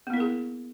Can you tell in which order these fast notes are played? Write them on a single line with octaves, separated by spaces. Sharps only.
B3 A#3 E4 A#4 G#4